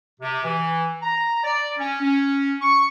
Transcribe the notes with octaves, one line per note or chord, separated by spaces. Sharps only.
C3
E3
A#5
D5
C#4
C#4
C#6